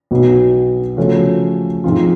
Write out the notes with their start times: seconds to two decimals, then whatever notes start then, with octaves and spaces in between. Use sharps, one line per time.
0.11 B1 B2 F#3 B3
0.97 C#3 F3 A3 C#4 F#4
1.84 G#2 F3 G#3 C4 F4